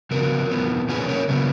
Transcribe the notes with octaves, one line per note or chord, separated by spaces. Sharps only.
C#3 F3 B3 F#4 A#4
A#2 F3 B3
B2 A#3 C#4 G#4 B4
A#4 C#5
C#3 F#3 B3